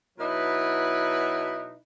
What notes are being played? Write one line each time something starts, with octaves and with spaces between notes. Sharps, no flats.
B2 F#3 D#4 E4 B4